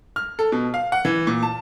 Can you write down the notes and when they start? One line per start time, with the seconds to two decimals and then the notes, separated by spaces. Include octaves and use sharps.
0.16 F6
0.39 A4
0.52 B2
0.74 F5
0.92 F#5
1.05 E3
1.27 A#2
1.43 A5